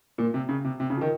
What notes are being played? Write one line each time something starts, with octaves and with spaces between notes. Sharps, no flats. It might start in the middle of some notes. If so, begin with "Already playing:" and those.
A#2
C3
C#3
C3
C3
C#3
F3
D#3